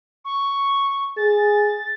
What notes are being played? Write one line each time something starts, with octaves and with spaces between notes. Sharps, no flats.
C#6
G#4 A6